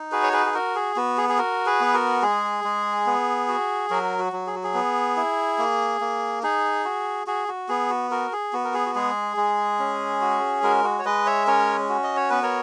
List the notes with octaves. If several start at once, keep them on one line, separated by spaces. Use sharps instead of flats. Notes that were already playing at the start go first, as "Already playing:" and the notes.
Already playing: D#4
F#4 G#4 B4
C#5
G#4 B4
G#4
F#4 A#4
G#4
B3 F#4
G#4
G#4
F#4 A#4
G#4 B4
B3
F#4 A#4
G#3 G#4
G#3
B3
F#4
F#3 F#4 A#4
F#4
F#3
G#4
F#4
G#4
B3
E4
A#3
A#3
D#4 G#4
F#4
F#4 G#4
F#4
B3 G#4
F#4
F#4 A#4
G#4
B3 F#4
A#4
G#4
F#4
G#3 G#4
G#3
C#4
F#4
G#3 F#4 A#4
F#4
C#5
G#3 B4 D#5
C#5 E5
C#4 A#4 C#5
F#4
D#5
C#5
B3 B4
A#4 C#5